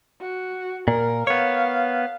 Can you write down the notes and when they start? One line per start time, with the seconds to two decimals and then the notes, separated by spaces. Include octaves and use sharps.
0.21 F#4
0.88 A#2 A#4
1.27 B3 C#5 F5